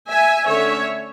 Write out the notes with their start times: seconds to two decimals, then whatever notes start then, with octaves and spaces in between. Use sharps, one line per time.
0.08 E5 G#5
0.47 D3 A3 C#4 C#5 E5